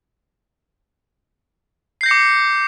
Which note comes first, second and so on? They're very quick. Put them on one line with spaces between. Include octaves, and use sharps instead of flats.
C7 G6 A#6 C#7 D6